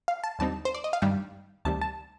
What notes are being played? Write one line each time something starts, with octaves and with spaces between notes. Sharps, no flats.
F5
A5
D#2 D3 G3 C4 D#4 A5
C5
D5
D#5
F5
G2 D#3 G3 D4 G5
D2 C3 D#3 G3 A5
A5